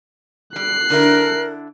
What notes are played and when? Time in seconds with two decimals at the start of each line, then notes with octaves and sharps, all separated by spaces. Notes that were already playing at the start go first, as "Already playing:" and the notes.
0.56 G3 F#6 C7
0.90 D3 D4 E4 A#4